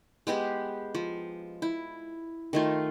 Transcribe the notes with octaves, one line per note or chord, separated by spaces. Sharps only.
G#3 B3 G4 G#4
F3
E4
D#3 A3 F4